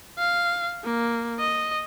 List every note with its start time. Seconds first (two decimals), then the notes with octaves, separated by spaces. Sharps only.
0.18 F5
0.84 A#3
1.40 D#5